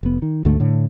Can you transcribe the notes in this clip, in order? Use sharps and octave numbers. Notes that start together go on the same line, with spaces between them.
F1 B3
D#3
D2 G#2 D3 A3
A2 D3